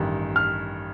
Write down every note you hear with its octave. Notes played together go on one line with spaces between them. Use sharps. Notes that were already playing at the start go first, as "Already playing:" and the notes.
Already playing: A1 G2 D#3
F6